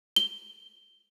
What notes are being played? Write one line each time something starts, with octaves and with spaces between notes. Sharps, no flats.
G7